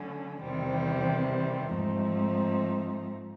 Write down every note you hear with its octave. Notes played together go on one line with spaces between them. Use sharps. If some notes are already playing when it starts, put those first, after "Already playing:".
Already playing: D3 F#3 A3 C#4
E2 C3 D#3 G3 C4
G#2 F3 A3 C4 D#4